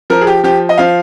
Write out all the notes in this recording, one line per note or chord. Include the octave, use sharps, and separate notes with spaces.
F3 A#4
G#4
G4
F3 G4
D#5
F3 F5